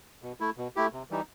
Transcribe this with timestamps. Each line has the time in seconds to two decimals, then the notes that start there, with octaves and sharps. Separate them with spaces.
0.23 B2
0.40 A3 E4
0.58 B2
0.76 A3 E4 G4
0.93 C3
1.10 E3 G3 D#4